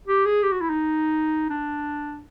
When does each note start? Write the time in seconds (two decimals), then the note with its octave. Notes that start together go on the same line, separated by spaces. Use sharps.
0.07 G4
0.25 G#4
0.43 G4
0.52 F#4
0.61 E4
0.70 D#4
1.50 D4